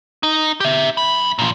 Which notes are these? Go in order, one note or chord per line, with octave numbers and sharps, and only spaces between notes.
D#4
G4 E5
F#2 B5
A#2 F3